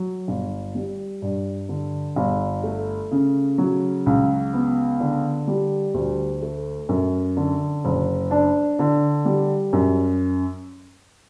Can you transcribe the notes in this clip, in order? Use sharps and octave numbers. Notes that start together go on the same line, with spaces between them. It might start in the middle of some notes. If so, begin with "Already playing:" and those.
Already playing: F#3
G1
G3
G2
D3
G1
A3
C#3
F#3
C#2
B3
D3
G3
D2
A3
F#2
D3
F#1
D4
D3
G3
F#2